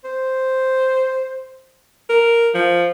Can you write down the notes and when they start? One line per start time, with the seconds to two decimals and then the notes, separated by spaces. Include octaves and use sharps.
0.04 C5
2.10 A#4
2.54 F3